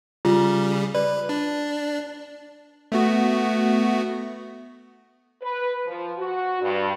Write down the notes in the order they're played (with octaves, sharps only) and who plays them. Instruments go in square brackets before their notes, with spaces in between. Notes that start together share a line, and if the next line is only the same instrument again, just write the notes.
[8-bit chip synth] C#3 G3 [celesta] F4
[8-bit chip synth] B4 [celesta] D5
[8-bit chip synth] D4
A3 B3 F#4
[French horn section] B4
F3
F#4
G2